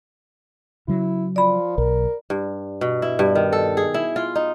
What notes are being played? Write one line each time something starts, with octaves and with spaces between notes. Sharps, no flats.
C#3 F#3 E4
F3 D5 B5
B1 A#4
G2
B2
E4
G2
D#3
A4
G#4
E4
F4
D#4